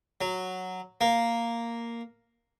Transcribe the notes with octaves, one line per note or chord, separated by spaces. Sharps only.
F#3
A#3